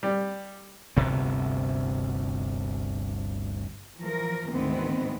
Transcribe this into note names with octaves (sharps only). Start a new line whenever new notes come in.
G3
G1 D2 C3 B3
E3 F3 A#4
D2 G#2 D#3 E3 B3 C4